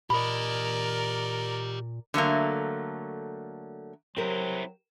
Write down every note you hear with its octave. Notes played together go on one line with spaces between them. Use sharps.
A#2 G4 A#4 D5 D#5 B5
D3 F#3 A3 A#3
F#3 C4 E4 G4 A#4 C5